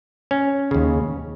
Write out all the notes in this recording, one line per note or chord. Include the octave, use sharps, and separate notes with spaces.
C#4
D#2 C#3